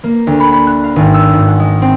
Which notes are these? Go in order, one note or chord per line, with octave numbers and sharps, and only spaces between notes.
A#3
D2
B5
B5
F#6
F5
G#1
E6
G#2
F#5
G#3
C4